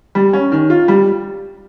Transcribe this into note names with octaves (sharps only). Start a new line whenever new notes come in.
G3
C#4
D#3
F4
G3